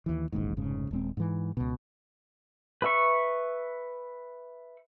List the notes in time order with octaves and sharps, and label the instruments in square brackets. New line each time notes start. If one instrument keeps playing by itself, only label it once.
[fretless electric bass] D#2 E3
E1 A1 D#2 G#2
F1 G#2 C#3
D#1 G#3 C4
G#2 E3
C#2 B2
[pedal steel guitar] B4 E5 C#6